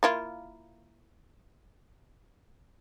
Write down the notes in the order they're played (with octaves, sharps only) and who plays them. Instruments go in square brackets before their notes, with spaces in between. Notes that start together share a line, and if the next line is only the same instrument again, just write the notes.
[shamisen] A#3 E4 F4